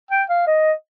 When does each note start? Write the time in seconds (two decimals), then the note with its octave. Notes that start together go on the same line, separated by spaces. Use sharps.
0.11 G5
0.29 F5
0.47 D#5